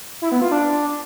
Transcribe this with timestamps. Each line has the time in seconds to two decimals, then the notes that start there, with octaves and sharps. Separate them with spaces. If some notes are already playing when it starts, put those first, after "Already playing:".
0.22 E4
0.32 B3
0.42 F4
0.52 D4